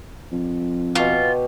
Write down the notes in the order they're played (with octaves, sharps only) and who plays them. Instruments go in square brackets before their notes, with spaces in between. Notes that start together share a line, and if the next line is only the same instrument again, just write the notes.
[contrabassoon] F2
[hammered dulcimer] B2 G4 C#6 [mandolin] F4